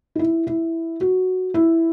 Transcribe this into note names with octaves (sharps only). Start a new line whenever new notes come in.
D#4
E4
E4
F#4
E4